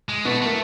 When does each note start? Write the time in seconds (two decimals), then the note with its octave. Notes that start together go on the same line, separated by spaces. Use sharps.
0.09 G#3
0.25 B2 A3 B3
0.42 A3 A#3